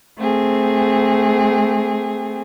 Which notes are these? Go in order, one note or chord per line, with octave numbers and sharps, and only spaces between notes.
A3 C4 G#4